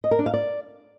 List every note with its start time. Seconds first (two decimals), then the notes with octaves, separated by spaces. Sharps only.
0.04 D#5
0.11 A#4
0.19 D4
0.26 F5
0.34 D5